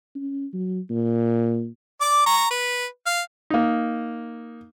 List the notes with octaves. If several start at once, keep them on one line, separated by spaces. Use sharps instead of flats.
C#4
F#3
A#2
D5 D6
A#5 C#6
B4
F5
A#3 D#4